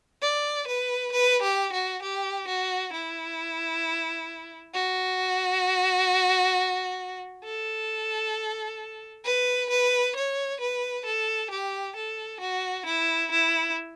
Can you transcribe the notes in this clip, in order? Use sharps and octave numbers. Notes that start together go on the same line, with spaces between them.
D5
B4
B4
G4
F#4
G4
F#4
E4
F#4
A4
B4
B4
C#5
B4
A4
G4
A4
F#4
E4
E4